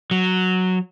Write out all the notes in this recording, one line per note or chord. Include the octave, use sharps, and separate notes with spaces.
F#3